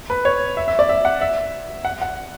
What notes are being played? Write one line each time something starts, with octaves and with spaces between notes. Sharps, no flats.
B4
C#5
E5
E5
D5
E5
F#5
E5
F#5
F#5